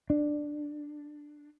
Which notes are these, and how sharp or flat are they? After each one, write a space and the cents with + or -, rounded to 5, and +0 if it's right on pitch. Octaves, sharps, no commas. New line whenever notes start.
D4 +10